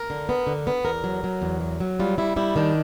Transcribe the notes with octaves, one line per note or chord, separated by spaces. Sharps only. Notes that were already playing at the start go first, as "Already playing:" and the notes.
Already playing: A#4
D3
B3
D3
B3
E2 A#4
F#3
F#3
E2
F#3
F#3
G3 F4
G3 E4
G3 E4
D#3 D4